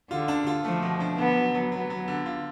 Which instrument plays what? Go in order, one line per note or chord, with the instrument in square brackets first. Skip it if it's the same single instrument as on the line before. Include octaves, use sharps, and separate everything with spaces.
[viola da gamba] D3 [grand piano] F4
[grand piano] D4
F4
[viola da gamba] F3 [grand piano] A3
[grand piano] B2
D4
[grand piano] D3 [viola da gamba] B3
[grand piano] F#3
F#3
[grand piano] F#3 [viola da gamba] B3
[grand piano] F#3
D3
F4